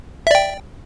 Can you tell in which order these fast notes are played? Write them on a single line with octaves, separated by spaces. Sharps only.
E5 D5 G5